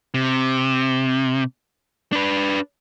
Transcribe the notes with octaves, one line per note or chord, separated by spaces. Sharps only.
C3
D4 B4